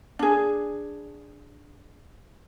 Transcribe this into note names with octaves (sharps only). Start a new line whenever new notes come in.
D4 G#4